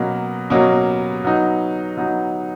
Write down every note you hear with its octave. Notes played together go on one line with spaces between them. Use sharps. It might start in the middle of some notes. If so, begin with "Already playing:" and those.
Already playing: B2 F#3 A#3 C#4
B2 F#3 A#3 C#4
F#3 B3 D#4
F#3 B3 D#4